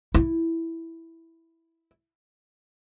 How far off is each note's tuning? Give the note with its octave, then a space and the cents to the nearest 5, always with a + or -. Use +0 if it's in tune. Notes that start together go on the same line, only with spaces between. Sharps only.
E4 +0